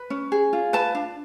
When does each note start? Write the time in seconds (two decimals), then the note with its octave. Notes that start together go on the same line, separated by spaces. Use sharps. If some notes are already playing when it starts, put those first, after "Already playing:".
Already playing: B4
0.10 C#4
0.32 G#4
0.53 F4
0.73 B4 A5
0.95 D4